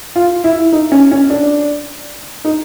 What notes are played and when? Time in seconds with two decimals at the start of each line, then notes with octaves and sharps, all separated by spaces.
0.16 F4
0.44 E4
0.72 D#4
0.92 C#4
1.11 C#4
1.30 D4
2.45 D#4